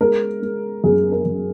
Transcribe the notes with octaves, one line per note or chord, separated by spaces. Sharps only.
G#3 A#4
G#3
F#2 G#4
A#4
F#2